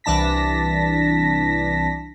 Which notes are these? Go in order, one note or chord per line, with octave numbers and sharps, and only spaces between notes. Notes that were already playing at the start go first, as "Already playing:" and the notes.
C2 E3 D4 A5 A#6 B6